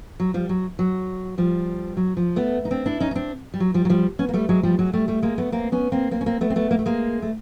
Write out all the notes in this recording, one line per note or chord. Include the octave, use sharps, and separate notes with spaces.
F#3
F3 G3
F#3
F#3
F3 G3
F#3
F3
A3 B3
D#4
C4 D4
D4 E4
C#4 D#4
D#4
C4 D4
G3
F#3
F3 G3
F#3
F3 G3
B3 C#4
A#3
G3 A3
F#3 G#3
F3 G3
F#3 G#3
G3 A3
G3 A3
G#3 A#3
A3 B3
A#3 C4
B3 C#4
A#3 C4
A#3 C4
C#4
A#3 C4
A3 B3
C4
A3 B3
A#3
A3
G#3 A#3
A3